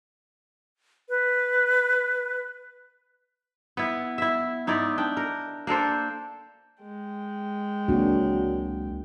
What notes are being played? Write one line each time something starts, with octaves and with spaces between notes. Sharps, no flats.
B4
B3 E4
E4 E5
G#2 D#4 E4 D5
D4 G5
A#4
A#3 D4 A4 C5
G#3 G5
C#2 E3 F#3 A#3 C4 D4 F#4